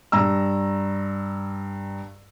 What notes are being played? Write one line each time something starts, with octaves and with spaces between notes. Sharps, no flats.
G2 A#5 E6